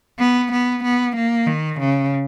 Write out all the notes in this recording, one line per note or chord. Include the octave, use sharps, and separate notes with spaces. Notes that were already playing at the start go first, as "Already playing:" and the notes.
B3
B3
B3
A#3
D#3
C#3